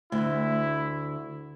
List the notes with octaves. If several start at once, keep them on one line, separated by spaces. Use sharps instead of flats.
D2 E4